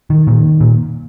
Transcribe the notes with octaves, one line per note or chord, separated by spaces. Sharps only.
D#3
A#2 D#3
A#2